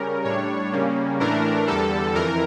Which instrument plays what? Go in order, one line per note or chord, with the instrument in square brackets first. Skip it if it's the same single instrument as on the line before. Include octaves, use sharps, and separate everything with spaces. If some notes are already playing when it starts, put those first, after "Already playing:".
Already playing: [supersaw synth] C#3 G3 C#4 A#4
A2 G3 D4 C#5
C#3 G3 A#3 C#4
A2 E3 A3 D4 A#4
E2 D3 G3 A4
F2 E3 A#4